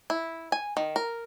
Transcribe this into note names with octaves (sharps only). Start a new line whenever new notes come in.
E4
G#5
D#3
A#4